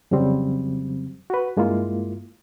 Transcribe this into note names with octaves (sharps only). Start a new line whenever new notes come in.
F2 C#3 F#3 G3 C4
F#4 B4
G2 G#3 A#3 E4 F4